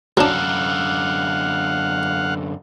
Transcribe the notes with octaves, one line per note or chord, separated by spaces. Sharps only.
F#2 D3 F#3 D4 F5 F#5